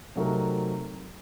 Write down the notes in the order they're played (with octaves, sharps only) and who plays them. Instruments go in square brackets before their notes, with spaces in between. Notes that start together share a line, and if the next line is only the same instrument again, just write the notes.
[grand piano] C3 F#3 A3 D#4 A#4